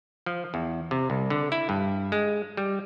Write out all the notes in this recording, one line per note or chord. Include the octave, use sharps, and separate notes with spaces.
F3
E2
C3
C2
D3
E4
G2
G#3
G3